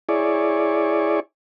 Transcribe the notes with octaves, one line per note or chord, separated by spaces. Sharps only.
E4 G#4 C#5 D5